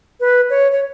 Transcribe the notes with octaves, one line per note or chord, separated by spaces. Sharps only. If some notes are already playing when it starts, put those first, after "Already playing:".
B4
C#5
C#5